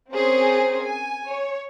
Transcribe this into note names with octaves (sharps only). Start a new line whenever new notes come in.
C4 C#4 G#4 A#4 C5
G#5
C#5